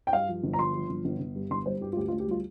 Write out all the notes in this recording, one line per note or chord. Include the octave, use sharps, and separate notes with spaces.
G5
G2 F5
F3
G1
A#5
F3 C6
F3
G1
G1
G1
G2
G1 C6
G3 C5
G2 G4
F4
D2 G4
F4
D2
G4
G3 F4